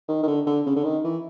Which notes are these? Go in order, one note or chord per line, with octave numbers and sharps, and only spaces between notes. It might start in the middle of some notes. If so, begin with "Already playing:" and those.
D#3
D#3
D3
D3
C#3
D3
D#3
E3